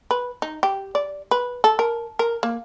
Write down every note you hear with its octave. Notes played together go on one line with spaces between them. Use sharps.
B4
D#4
G4
D5
B4
A4
A#4
A#4
A#3